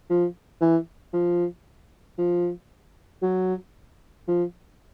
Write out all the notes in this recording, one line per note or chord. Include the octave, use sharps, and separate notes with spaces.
F3
E3
F3
F3
F#3
F3